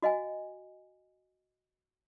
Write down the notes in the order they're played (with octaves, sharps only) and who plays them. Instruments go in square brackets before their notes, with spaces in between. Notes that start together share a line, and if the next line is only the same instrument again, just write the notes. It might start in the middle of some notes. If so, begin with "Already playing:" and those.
[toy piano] F#4 D#5 F5 G#5